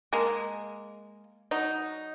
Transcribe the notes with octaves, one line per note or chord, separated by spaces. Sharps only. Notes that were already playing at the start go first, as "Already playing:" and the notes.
G#3 A#3
F#3 D#4